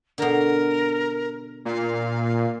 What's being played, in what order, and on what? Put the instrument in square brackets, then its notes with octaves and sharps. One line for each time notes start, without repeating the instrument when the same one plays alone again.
[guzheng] B2 D3 [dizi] A#4
[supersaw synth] A#2 [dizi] F5